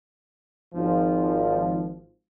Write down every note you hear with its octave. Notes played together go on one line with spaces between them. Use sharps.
G#1 F3